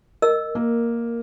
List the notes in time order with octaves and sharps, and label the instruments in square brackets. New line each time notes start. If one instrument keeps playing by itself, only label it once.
[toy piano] A#4 D#5 E6
[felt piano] A#3